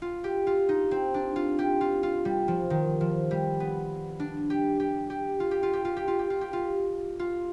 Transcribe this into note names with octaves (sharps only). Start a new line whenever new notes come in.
F4
G4
F4
D#4
C4
D4
F4
G4
F4
F4
G3
F3
D#3
F3
G3
B3
D4
G4
G4
G4
F4
G4
F4
G4
F4
G4
F4
G4
F4
G4
F4
F4